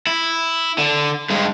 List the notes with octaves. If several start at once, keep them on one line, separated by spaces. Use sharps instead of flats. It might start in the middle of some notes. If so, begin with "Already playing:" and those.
E4
D3
G2 G#3